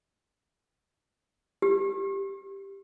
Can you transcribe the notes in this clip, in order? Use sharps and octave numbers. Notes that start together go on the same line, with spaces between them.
G4